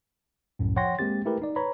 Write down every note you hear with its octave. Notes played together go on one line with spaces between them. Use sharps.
C2 F#2 A2
F3 C#5 F#5 G5 C6 A#6
G#3 A#3 C4 G4 A6
A3 E4 G4 A#4 B4
D#4 D5
B4 C#5 A#5 B5